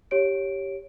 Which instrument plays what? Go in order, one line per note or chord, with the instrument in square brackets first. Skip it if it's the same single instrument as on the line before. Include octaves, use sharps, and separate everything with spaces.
[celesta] G4 C#5 D7